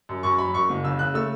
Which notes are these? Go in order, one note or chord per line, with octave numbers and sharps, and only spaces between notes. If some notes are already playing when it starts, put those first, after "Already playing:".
F#2
F#2 C#6
F#3 B5
F#2 C#6
F#1
C#3 E6
C#3 F#6
A3 E6